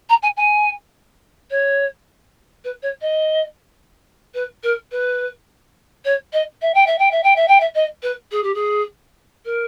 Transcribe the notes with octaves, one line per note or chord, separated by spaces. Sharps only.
A#5
G#5
G#5
C#5
B4
C#5
D#5
B4
A#4
B4
C#5
D#5
E5
G5
E5
G5
E5
G5
E5
G5
E5
D#5
B4
G#4
G4
G#4
A#4